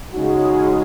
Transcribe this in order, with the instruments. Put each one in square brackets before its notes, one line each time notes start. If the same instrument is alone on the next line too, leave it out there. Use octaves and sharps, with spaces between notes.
[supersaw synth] C#3 G#3 C#4 G#4 [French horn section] D#4 F#4